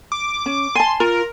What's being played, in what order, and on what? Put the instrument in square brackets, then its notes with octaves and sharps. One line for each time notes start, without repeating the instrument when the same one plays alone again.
[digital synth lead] D6
[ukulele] C#4
[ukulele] G#5 A5 [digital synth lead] C6
[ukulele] F4 [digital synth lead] A#4